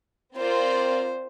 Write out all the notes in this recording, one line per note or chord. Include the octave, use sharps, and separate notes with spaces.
C4 F4 A#4 C5 D5